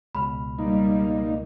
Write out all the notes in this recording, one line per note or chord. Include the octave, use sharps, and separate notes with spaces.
C#2 B2 B5 F6
G3 A#3 D#4